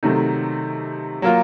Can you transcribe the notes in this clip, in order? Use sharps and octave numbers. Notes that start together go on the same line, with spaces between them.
C3 D#3 F#3 A3 D#4
F#3 A#3 F4